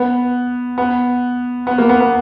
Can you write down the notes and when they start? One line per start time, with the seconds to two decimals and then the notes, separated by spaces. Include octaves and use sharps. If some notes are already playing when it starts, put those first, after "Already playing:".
Already playing: B3
0.78 B3
1.67 B3
1.78 A#3
1.89 B3
2.00 B3